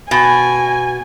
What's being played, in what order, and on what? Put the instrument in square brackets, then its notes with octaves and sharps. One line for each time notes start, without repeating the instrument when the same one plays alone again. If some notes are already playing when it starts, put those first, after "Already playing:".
[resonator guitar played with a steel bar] B2 [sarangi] G#5